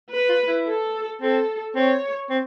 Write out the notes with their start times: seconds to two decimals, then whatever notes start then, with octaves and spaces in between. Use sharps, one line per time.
0.12 B4
0.29 F4
0.47 E4
0.66 A4
1.22 C4 A4
1.75 C4 C#5
2.30 C4